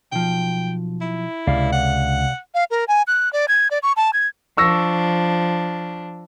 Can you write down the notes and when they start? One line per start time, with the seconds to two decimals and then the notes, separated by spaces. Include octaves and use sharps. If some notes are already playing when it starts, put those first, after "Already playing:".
0.12 B1 F3 G5
1.01 E4
1.47 C#2 C3 D5 F5
1.73 F#5
2.54 F5
2.71 A#4
2.88 G#5
3.07 F#6
3.33 D5
3.48 G#6
3.71 D5
3.83 C#6
3.96 A5
4.13 G#6
4.57 F3 D4 C#6 E6 A#6